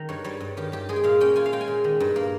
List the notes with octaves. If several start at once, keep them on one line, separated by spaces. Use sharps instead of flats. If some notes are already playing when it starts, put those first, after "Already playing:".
Already playing: D#3 A#5
G2 C#5
G3 C#5
G2
D#3 G4
G2 G4
G#3 G#4
G5
A#2 F5
C#4 G5
F4 G#5
F5
G#3 G5
G#5
A#2
D#3
G2
A#3